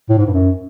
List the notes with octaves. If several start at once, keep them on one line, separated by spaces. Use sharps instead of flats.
A2
G#2
G2
F#2